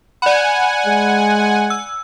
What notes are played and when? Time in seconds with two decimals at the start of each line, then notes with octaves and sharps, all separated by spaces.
0.22 D5 F#5 G#5 B5
0.87 G#3
1.70 E6